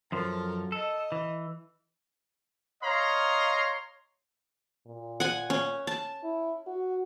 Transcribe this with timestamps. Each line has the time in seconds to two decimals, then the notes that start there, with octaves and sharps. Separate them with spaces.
0.12 F#2 F3 A4 A#4
0.72 A4 D#5
1.12 E3
2.82 C#5 D#5 F5 A#5 C6
4.86 A#2
5.20 F#5 G#5
5.50 C#4
5.87 A5
6.24 E4
6.67 F#4